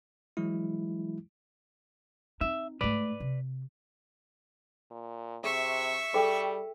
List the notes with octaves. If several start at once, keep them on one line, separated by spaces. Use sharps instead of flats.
E3 F#3 G#3 E4
C4 D#4 E5
G#2 A3 B4 D5
C3
A#2
C3 G#4 E5 C#6
G3 G#4 A4 G5